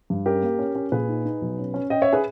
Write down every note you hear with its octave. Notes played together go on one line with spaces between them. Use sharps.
G2
C#4 G4 A#4
A#3
C#4
C#4
A#2 G#4 B4
D#4
D#4
B1
C#4
C#4
C#4 D#5 G5
C#5 E5
G#4 B4